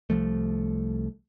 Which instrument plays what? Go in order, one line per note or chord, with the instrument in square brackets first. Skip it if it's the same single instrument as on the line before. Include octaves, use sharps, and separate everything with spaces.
[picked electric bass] C2 F3 A3